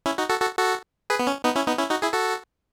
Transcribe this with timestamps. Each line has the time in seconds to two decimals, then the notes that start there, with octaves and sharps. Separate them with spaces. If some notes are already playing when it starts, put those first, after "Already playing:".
0.06 C#4 E4
0.18 D#4 F#4
0.29 F#4 A4
0.41 F#4 A4
0.57 F#4 A4
1.10 G#4 B4
1.19 B3
1.27 C#4
1.45 B3 D#4
1.56 C#4 E4
1.67 B3 D#4
1.78 C#4 E4
1.90 D#4 F#4
2.02 E4 G#4
2.13 F#4 A4